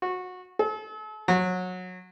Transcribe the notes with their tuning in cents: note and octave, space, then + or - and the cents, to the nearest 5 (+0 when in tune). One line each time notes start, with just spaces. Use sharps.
F#4 -20
A4 -40
F#3 -20